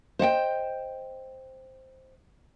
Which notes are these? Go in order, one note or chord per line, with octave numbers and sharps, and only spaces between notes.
C5 D#5 F#5 G5